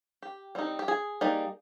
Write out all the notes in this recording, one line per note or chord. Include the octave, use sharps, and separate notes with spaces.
G4
G3 C4 D#4
G4
G#4
G3 A#3 D#4